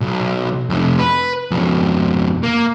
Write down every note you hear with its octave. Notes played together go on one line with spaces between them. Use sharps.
B1
F2 C3
B4
F2 B2
A#3